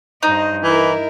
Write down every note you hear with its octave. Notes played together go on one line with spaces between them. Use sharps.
G2 D#4 C5 D#5
E3 E4 A#4